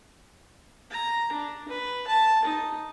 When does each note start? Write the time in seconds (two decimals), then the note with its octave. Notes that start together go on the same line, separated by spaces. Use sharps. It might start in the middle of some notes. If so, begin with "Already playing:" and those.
0.91 A#5
1.32 D4
1.68 B4
2.07 A5
2.45 D#4